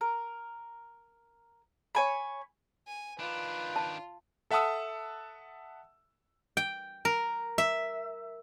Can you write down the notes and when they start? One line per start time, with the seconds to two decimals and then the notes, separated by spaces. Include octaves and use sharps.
0.01 A#4
1.95 C#5 G#5 B5
2.87 G#5
3.19 D#3 D4 F4 B4
3.76 A5
4.51 A4 E5 F#5 A5 D#6 E6
6.57 G5
7.05 A#4
7.58 E5